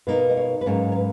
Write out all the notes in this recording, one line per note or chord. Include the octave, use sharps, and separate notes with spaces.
B2 A#3 D#4 B4
D#5
C#5
B4
G#2 F#3 A#3 C#4 C#5
C#5
B4